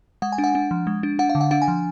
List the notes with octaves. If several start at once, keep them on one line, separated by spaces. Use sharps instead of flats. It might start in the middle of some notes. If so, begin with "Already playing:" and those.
G#3 F#5
G#5
D4
F#5
D4
F3
G#3
D4
D4 F#5
F5
D3
F#5
D4 F#5
G#5
F3